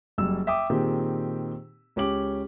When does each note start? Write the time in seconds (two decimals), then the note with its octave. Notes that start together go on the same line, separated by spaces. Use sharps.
0.18 F#1 F#2 G3 E6
0.47 E5 G5 D6 D#6
0.70 A#2 D#3 C4 G4 G#4
1.96 C#2 C#4 G4 D6 F#7